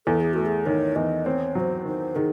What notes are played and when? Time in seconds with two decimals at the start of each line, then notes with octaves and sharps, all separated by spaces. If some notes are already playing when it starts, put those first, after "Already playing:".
0.06 E2 A4
0.20 G#4
0.33 A3 F#4
0.46 G#4
0.66 D#3 C#5
0.96 E2 D#5
1.25 C4 C#5
1.55 F#3 C5 C#5
1.85 D#3 C5
2.16 D#3 G#4